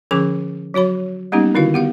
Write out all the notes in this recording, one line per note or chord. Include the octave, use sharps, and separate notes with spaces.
D3 F3 C#4 G#4 D6
F#3 F#4 C#5 B5
G3 A#3 B3 C#4 D#4 G4
D3 D#3 E4 F#4 F5
B3 G4 F5